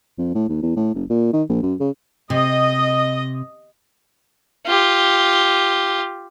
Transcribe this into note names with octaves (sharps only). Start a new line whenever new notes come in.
F2
A2
D#2
E2
A2
F#1
A#2
D#3
A#1
F#2
C#3
C3 D#5
F4 G4